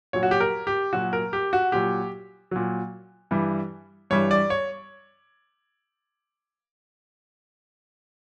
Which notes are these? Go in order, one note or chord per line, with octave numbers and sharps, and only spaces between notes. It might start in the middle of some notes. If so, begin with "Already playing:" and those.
A#2 F#3 C#5
F#4
G4
A#4
G4
A#2 F#3 F#4
A#4
G4
F#4
A#2 F#3 G4
A#2 F#3
G2 E3 G3
G2 E3 G3 C#5
D5
C#5